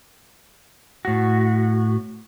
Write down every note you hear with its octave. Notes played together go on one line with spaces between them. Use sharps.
A2 F#4